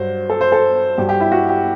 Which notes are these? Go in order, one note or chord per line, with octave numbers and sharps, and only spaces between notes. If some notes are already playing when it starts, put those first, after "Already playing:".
Already playing: G2 F#3 C5
A4
C5
A4
G2 F#3 G4
G4
E4
F#4
G4